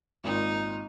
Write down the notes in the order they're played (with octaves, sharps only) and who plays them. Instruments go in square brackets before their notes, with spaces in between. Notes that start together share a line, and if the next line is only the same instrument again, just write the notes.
[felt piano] G#1 A#2 [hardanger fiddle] D#4